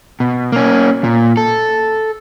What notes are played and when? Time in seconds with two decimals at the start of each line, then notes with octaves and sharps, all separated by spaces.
0.20 B2
0.52 A#3 C#4
1.04 A#2
1.37 A4